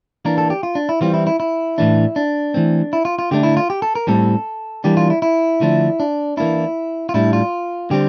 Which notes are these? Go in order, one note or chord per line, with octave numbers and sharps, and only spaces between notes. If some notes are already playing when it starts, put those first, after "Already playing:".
E3 A#3 D4 A#4
A4
G4
F4
D4
E4
E3 G3 C4 F4
E4
E4
E4
A2 E3 A3 D4
D4
E3 A3 C4
E4
F4
F4
D3 A3 D4 G4
E4
F4
G4
A4
A#4
A2 G3 C4 A4
E3 G3 A#3 D4 G4
F4
E4
E4
D3 F3 A3 D4
D4
E3 A#3 D4 E4
F4
A2 G3 D4 E4
F4
D3 G3 C4 G4